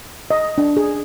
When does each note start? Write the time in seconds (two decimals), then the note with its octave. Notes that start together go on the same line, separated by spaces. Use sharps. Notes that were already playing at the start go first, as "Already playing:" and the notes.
0.31 D#5
0.58 D4
0.77 G#4